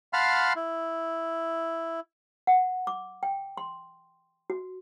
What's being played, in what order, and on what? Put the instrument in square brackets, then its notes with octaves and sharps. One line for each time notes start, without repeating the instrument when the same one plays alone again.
[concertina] F5 F#5 A5 B5 C6 F6
E4
[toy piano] F#5
D6
G5
C6
F#4